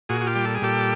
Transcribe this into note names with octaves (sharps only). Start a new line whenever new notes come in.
A#2 F#4 G#4
F#4
F4 G4
G3
A4
G#4
A#2 G4 A4